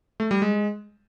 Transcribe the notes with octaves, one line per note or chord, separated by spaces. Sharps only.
A3
G3
G#3